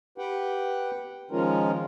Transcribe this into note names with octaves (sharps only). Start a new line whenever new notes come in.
G4 B4 F#5 G5
D#3 F3 G#3 C#4 F4 A#4